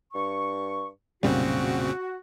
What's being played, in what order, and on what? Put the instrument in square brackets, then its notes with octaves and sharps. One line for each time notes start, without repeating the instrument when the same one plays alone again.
[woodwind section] G2 C#6
[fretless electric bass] B1 F#2 G3 [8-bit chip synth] A#2 C#3 C4 [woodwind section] F#4